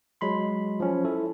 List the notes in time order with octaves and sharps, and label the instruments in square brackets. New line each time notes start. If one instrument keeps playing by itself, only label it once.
[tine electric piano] F#3 G#3 B5 C6
F3 C#4
E4 A4